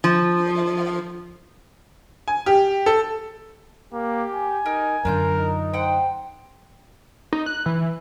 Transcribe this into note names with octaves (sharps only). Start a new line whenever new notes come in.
F3
G#5
G4
A4
A#3 G4
G#5
D#4 A#4
F#2 D3 D4 F4 A#4 G6
D#4
C5 F#5 G5
D#4
F#6
E3